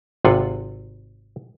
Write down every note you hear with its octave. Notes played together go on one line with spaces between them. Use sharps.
G#1 C3 F4 F#5